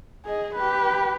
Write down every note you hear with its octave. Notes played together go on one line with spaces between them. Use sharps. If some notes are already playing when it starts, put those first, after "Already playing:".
G#4 D#5
G4 B4